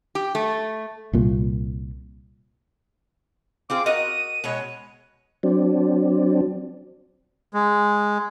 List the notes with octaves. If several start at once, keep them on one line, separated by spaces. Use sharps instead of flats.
G4
A3
C2 A#2
C4 F4 G#4 D6
F#4 A#4 D#5 D#7
B2 G#3 C#5
F#3 C4 D4
G#3